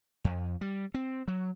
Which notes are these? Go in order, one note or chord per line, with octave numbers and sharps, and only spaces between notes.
F2
G3
C4
F#3